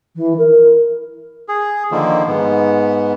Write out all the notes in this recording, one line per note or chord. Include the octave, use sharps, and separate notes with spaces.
E3
A#4
G#4
D3 D#3 F3 A#3
G#2 B3